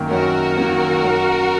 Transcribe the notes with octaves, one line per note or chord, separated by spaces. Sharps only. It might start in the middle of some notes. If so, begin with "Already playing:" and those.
Already playing: F#2 D#3 A#3
F#2 F#4 A#4
D#3 A#3
F#2